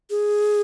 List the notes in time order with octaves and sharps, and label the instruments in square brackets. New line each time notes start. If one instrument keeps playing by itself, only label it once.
[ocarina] G#4